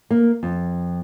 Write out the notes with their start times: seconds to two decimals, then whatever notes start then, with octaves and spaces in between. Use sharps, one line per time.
0.11 A#3
0.43 F2